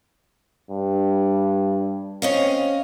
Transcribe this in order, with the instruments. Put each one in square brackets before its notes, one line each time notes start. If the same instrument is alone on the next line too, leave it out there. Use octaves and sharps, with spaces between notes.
[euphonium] G2
[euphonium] C4 [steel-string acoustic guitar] C#4 D#5 F5